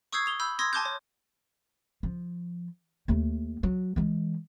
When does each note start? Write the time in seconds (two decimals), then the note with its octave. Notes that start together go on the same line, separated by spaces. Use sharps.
0.12 C#6 D#6 E6 G6 G#6 C7
0.26 D#6 F7 G7
0.40 B5 E6 G6
0.59 C6 D#6 E6 G#6 A#6
0.73 G#5 A5 C6 D6 F#6 G6
0.85 C#5
2.03 F3
3.08 D#2 A3
3.63 F#3
3.96 E3 G#3